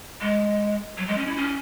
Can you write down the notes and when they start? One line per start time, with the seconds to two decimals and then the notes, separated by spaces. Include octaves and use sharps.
0.21 G#3
0.97 F#3
1.08 G#3
1.17 C#4
1.27 E4
1.37 C#4